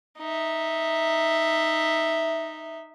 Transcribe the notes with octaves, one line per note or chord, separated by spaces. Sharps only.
D#4 E5